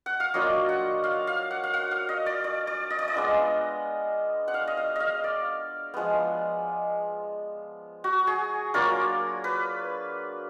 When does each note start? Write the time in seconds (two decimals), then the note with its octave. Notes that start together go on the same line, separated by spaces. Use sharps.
0.06 F#5
0.20 F5
0.34 F#3 A#3 D4 F4 D#5
0.69 F#5
1.04 F5
1.27 F5
1.51 F#5
1.64 F5
1.74 F#5
1.91 F5
2.09 D#5
2.26 D5
2.44 D5
2.67 D5
2.90 D#5
2.99 D5
3.08 D#5
3.13 G#3 B3 D4 F4
4.48 F#5
4.54 F5
4.67 D#5
4.77 F5
4.96 D#5 F5
5.24 D5
5.94 F3 G#3 B3
8.04 F#4
8.27 G#4
8.74 F#3 A#3 D4 F4 A#4
9.44 B4